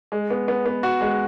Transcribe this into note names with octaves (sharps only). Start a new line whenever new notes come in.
G#3
B3
B3
B3
F#4
G#3